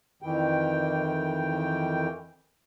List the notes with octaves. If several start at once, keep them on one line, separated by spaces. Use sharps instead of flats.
F2 D#3 E3 G5